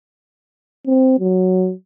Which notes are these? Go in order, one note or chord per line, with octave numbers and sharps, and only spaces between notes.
C4
F#3